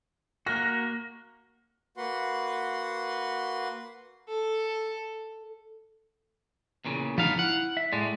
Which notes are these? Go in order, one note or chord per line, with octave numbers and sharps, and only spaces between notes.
A#3 F#4 F6 F#6 A#6
A#3 F#4 B4 F#5 C6
A4
E2 A#2 C#3
F3 G3 B3 D#4 F5
E4 F#5
E5
A2 G#3 D5